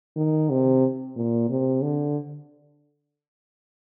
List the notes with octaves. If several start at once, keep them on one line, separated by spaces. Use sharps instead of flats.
D#3
C3
A#2
C3
D3